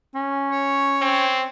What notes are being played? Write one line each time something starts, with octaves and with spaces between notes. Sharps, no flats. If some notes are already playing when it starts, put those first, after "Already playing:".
C#4
C#5
C4